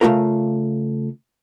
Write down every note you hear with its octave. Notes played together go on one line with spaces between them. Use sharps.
C#3 A3 C#4 D4 F4 A#4